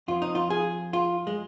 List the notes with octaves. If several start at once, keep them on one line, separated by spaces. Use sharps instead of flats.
F2 F3 F4
D#4
F4
G#4
F4
G#3